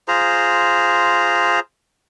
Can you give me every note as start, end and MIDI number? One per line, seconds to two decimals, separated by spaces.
0.08 1.60 65
0.08 1.60 68
0.08 1.60 72
0.08 1.60 82